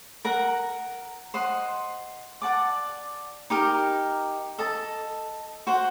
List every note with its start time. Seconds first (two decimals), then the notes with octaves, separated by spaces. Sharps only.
0.25 A#4 F#5 A#5
1.34 C5 D#5 F#5 C6
2.42 D5 F#5 A5 D6
3.50 D#4 G4 A#4
4.59 A4 D#5 A5
5.67 F#4 C5 F#5